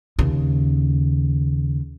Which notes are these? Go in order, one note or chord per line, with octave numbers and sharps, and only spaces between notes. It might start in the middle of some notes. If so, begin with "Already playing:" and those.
D#2 C#3